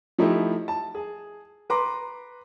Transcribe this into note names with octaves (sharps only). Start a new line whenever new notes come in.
F3 A3 D#4 E4 G4
A5
G#4
B4 A#5 C6 D6